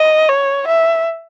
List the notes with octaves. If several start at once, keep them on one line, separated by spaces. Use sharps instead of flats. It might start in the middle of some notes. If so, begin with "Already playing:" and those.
Already playing: D#5
C#5
E5